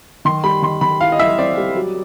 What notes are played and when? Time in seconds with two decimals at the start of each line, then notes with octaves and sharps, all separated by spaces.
0.25 D#3 C6
0.44 G3 B5
0.62 D#3 C6
0.81 D#3 B5
1.01 E4 F5
1.12 D#5
1.19 E4 E5
1.38 C4 D5
1.58 G3
1.77 F#3